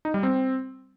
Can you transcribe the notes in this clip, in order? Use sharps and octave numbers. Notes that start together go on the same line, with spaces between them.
D#4
G3
C4